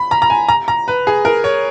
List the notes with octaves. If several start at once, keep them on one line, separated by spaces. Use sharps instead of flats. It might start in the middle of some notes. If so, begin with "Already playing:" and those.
Already playing: B5
A#5
A#5
G#5
A#5
A#5
B4
G#4
A#4
C#5